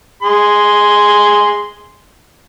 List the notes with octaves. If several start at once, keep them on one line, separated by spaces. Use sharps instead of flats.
G#4 C6